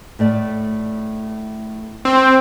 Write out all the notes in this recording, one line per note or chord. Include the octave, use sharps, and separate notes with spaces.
A2 A3 D5
C4